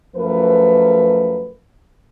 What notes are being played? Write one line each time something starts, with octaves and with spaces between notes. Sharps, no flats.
F#2 F3 A3 A#4 B4